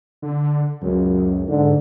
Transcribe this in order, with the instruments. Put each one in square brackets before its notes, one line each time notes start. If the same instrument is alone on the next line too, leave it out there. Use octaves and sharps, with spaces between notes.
[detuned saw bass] D3
[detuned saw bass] C#2 [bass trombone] F#2
[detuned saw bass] G#2 [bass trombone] D3